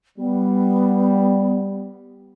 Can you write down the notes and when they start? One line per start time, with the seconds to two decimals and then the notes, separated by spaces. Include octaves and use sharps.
0.17 G3 B3